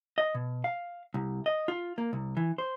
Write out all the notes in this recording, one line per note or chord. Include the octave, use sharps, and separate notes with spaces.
D#5
B2
F5
C2
D#5
F4
A#3
C2
E3
C5